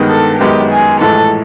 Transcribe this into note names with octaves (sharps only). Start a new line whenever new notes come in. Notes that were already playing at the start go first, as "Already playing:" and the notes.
Already playing: G2 D#3 G#3 B3 D#4
A4
F#2 D#3 G#3 B3 G4
G#4
A#1 A2 E3 G#3 A4